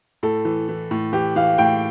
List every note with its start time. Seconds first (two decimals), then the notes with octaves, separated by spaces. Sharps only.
0.23 A2 A4
0.45 E3
0.69 E3
0.91 A2
1.13 E3 G4
1.36 E3 F5
1.58 A2 G5